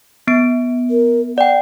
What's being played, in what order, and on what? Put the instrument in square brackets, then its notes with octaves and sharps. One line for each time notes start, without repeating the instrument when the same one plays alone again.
[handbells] B3 D7
[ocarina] A#4
[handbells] D5 G5 [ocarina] F#5